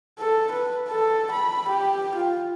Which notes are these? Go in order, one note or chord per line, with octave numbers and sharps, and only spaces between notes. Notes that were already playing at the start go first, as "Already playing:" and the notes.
A4
B4
A4
B5
G4
F4